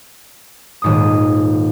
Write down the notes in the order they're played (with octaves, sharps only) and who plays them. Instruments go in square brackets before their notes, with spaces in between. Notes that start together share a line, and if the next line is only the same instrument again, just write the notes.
[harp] D#1 G#2 D#6